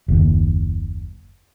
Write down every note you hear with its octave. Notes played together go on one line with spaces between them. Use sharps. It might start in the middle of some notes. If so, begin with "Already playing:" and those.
F#1 D#2